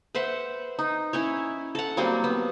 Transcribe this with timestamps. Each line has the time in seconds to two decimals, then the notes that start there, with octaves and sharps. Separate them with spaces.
0.15 B4 C5 E5 F#5
0.79 D#4
1.13 C#4 E4 C#5
1.75 A4 F#5
1.97 F#3 G3 A#3 C4
2.24 B3